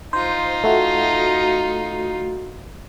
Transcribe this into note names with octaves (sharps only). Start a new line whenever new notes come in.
D#4 F4 C5
A3 F#4